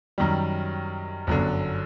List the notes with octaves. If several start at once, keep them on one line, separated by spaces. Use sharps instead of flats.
F#2 D#3 G3
G1 F#2 D3